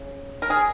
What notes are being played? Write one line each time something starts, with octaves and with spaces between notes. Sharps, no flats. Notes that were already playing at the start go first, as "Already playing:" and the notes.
Already playing: C#3
A#4
G#4